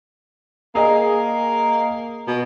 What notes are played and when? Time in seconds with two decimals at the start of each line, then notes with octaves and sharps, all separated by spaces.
0.75 A#3 G#4 D#5
2.28 B2